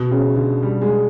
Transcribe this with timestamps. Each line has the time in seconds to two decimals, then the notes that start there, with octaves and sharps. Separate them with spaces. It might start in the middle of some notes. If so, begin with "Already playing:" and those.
Already playing: B2
0.11 C#3
0.36 D3
0.62 G3
0.82 G#3